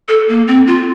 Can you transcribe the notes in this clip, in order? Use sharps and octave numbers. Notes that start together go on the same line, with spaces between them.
A4
A#3
C4
F4